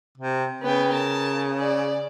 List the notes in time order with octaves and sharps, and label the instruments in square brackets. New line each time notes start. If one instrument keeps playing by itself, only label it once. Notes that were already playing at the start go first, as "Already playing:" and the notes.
[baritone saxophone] C3
[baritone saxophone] C#3 [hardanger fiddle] B3 G5
[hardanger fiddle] A#4 A5
D5